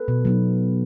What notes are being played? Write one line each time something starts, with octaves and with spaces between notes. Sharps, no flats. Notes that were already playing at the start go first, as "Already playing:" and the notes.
Already playing: A4 B4
B2
F#3 B3 D#4